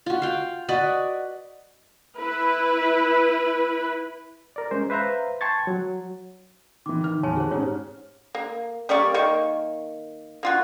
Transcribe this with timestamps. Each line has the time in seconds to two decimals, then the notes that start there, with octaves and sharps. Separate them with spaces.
0.06 F4 F#4
0.22 F5 G5
0.69 F#4 B4 D5 D#5
2.18 E4 B4
4.56 A#4 D5
4.71 G#3 C#4 C5
4.90 B4 C5 E5 F5 A#5
5.41 G5 A5 C6 C#6 G#6 A6
5.67 F#3
6.86 D#3 E3 D6
7.03 D#3 F6
7.23 E2 D#3 C#5 G#5 A5
7.36 F#4 G#4 C5
7.51 G#2 C#4 G4 C#5
8.35 A#3
8.89 G3 A#3 D5 C#6
9.14 D#3 A#3 C#6
10.43 A#3 F4 F#4